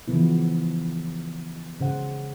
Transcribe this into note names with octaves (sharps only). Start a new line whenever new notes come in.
C#3 E3 F3 B3 E4
C#3 C5 F#5